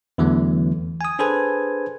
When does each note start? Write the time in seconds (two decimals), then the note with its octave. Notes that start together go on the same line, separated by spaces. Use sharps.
0.18 E2 D3 E3 F#3 A3 B3
1.01 G#5 D#6
1.19 D4 G#4 A4 B4 C5 G#5